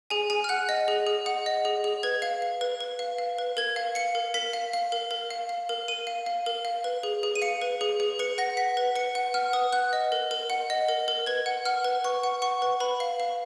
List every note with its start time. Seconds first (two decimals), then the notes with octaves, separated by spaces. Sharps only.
0.10 G#4 G#5
0.30 G#4 G#5
0.44 F6
0.49 F#5 F#6
0.69 D#5
0.88 G#4
1.07 G#4
1.26 F#5
1.46 D#5
1.65 G#4
1.84 G#4
2.03 B4 G#6
2.22 F5
2.42 F5
2.61 B4
2.81 B4
2.99 F5
3.18 F5
3.38 B4
3.57 A#4 G#6
3.76 F5
3.95 F5 C#7
4.15 A#4
4.34 A#4 B6
4.53 F5
4.73 F5
4.92 A#4
5.11 A#4
5.30 F5
5.49 F5
5.69 A#4
5.88 A#4 D#7
6.07 F5
6.26 F5
6.46 A#4
6.65 F5
6.84 B4
7.03 G#4
7.23 G#4
7.36 D#7
7.42 F5 C#7
7.62 B4
7.81 G#4
8.00 G#4
8.19 B4 C#7
8.38 F#5 A#6
8.57 F#5 B6
8.77 B4
8.96 B4 C#7
9.15 F#5
9.34 F#5 F6
9.53 B4 D#6
9.73 F#5 F#6
9.93 D#5
10.12 A#4
10.31 A#4
10.50 F#5
10.70 D#5
10.88 A#4
11.08 A#4
11.26 B4 G#6
11.46 F#5
11.65 F#5 F6
11.84 B4
12.04 B4 C#6
12.23 F#5
12.42 F#5 C#6
12.62 B4
12.80 B4 B5
13.00 F5
13.20 F5